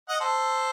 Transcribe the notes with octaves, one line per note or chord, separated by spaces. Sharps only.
D#5 F#5
A4 C5